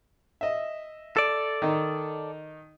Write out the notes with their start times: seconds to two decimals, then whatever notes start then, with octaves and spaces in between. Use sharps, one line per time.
0.41 D#5 E5
1.17 A4 D5
1.62 D#3 D#4